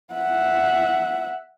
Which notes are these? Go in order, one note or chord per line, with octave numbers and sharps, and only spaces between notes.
E5 F#5